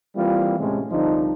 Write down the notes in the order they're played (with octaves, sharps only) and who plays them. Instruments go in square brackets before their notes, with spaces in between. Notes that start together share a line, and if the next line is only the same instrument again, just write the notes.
[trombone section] E3 G3 A#3 C4 E4 F4
A2 C3 G#3 A3 C#4 E4
C2 D3 F3 D4 D#4